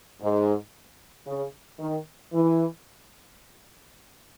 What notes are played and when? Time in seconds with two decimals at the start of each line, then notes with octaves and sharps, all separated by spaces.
0.22 G#2
1.27 C#3
1.80 D#3
2.33 E3